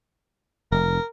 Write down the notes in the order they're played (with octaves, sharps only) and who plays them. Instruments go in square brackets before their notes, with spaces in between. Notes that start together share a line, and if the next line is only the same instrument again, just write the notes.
[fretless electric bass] F1 [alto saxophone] A#4